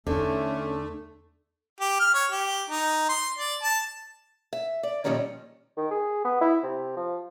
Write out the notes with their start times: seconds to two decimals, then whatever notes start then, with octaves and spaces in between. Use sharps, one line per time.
0.07 E2 D3 A3 C#4 D#4
1.81 G4
2.00 F6
2.14 C#5
2.31 G4
2.70 D#4
3.09 C6
3.38 D5
3.63 A5
4.53 E5
4.83 D5
5.04 A#2 D#3 F3 G3 C#4 D#4
5.77 D#3
5.91 G#4
6.25 B3
6.41 E4
6.63 C3
6.97 F3